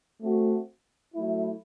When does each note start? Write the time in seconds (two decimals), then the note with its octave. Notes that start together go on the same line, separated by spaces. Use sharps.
0.21 A3 C4 F#4
1.15 F#3 A3 E4